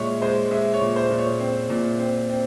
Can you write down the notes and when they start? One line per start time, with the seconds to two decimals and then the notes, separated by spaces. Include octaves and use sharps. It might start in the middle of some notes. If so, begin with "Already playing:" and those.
Already playing: A#2 G#3 C#5 E5
0.22 G#3 C5
0.51 G#3 E5
0.74 C#5
0.81 A#2
0.96 C5
1.11 A#2
1.18 C#5
1.40 C4
1.70 A#2
2.00 C4
2.30 C4